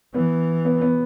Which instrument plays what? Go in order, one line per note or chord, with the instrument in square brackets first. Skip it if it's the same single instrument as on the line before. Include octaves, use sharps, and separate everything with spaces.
[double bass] E3 [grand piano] B3
[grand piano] B3
B3